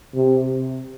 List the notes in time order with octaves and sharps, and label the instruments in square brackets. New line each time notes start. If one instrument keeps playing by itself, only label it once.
[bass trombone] C3